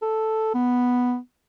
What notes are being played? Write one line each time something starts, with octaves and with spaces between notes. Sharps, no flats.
A4
B3